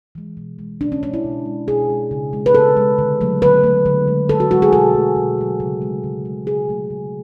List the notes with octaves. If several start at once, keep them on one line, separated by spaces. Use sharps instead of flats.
E3 G#3
B2
G#3
B2 D4
C#4
G#3 D4
E4
B2
G#3
B2 G#4
G#3
C#3
G#3
B4
C#3 A4
G#3
D3
F#3 A3
D3 B4
F#3 A3
D3
G#3
D3 A4
F#4
G#3 F#4
G#4
B2 A4
F#3 A3
B2
F#3 A3
C#3
G#3
C#3
G#3
C#3 G#4
F#3 A3
C#3